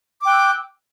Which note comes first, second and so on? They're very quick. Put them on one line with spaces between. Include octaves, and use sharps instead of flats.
D6 G5 F#6 E6